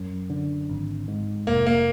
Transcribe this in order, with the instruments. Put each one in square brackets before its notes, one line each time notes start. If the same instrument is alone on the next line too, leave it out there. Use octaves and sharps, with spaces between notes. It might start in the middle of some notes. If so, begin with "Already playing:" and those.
Already playing: [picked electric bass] F#2
D3
G#1
G#2
[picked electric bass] F1 [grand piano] A#3
[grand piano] A#3